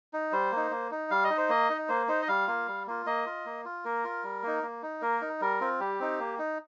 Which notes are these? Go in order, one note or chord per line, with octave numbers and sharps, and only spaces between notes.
D#4
G3 C5
A#3 D#4
A#3
D#4
G3 F5
D#5
D#4
C5
A#3 D#5
D#4
A#3 C5
D#4 C5
D#5
G3 F5
A#3 F4
G3
A#3 F4
A#3 D#5
F4
A#3
F4
A#3 A#4
F4
G3
A#3 D#4
A#3
D#4
A#3 A#4
D#4
G3 A#4
C4 F4
G3 G4
C4 D#4
A#3
D#4